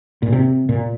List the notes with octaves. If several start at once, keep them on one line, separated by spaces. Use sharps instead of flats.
A#2
C3
A#2